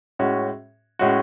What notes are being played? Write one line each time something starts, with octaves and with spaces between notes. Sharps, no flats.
A2 G#3 C#4 F#4
A2 G#3 C#4 F#4